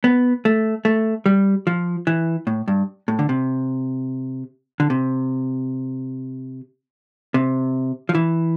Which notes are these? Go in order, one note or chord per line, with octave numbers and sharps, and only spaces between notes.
B3
A3
A3
G3
F3
E3
A2
G2
A2
D3
C3
D3
C3
C3
F3
E3